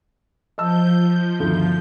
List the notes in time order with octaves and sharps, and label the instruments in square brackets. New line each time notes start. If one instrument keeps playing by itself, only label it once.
[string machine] F3 G6 [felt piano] D#5 A5 E6
[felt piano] G1 D2 D#3